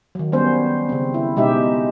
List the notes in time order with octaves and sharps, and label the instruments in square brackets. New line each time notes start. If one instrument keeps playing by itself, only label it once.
[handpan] D#3 F#3
G3 B3 C#4 C5
C#3 C4
E4
B2 G#3 D#4 G4 E5